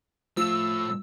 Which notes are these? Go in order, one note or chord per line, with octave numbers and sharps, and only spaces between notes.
A2 F3 E6 E7